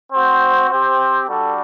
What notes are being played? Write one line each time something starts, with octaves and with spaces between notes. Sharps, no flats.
C4 F#4 C5
C4 G4 C5
G3 D4 F#4 A4